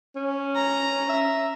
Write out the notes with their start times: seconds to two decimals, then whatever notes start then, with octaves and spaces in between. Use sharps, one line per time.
0.16 C#4
0.56 A#5
1.09 E5